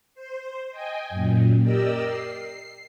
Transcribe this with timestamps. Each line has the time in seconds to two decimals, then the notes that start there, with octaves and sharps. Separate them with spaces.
0.14 C5
0.70 D#5 G5 G#5
1.09 F#2 A#2
1.61 G4 A#4 D5 D#5 E6
2.05 C7